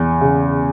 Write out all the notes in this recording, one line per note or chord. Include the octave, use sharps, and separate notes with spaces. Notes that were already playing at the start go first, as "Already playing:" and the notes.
Already playing: E2
C#3